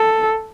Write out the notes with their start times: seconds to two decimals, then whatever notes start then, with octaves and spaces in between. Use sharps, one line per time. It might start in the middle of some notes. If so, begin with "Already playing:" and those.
Already playing: A4